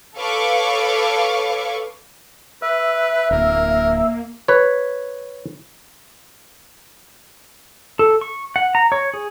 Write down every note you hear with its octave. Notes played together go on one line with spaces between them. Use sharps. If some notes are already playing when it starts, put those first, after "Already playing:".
A4 B4 C#5 F5 C#6 D6
B4 E5
D1 A#3 A#4
B4 C#5
A4
C#6
F#5
A#5
C#5
G#4